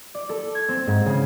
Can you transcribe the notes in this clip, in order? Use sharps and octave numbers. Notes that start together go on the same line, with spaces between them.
D5
A4
G#6
C4
G#2
C#3